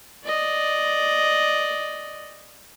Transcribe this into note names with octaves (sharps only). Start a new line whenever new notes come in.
D5 D#5